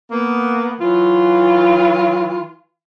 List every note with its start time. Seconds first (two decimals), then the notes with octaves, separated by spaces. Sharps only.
0.11 A#3 B3
0.81 E3 F#3 F4